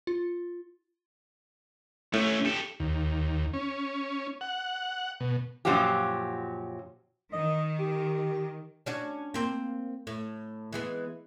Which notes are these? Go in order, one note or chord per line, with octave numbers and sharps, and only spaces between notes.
F4
A2 A3 C#4
G4 A4
D#2
C#4
F#5
B2
F#2 A#2 F3 F#3 F#4 G4
D#3 D#5
G4
C#4 D4 F#4
A#3 C4
A2
E3 G#3 B3